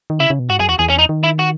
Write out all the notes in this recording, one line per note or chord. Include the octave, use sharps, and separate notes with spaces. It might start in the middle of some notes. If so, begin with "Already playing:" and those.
D#3
C#3 E4
C#3
B2
G#2 F#4
F#2 G#4
E2 F#4
E2 G#4
C#4
D#4
D#3
E4
F#4